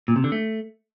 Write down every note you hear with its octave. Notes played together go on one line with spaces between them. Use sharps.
A#2
C3
D3
A3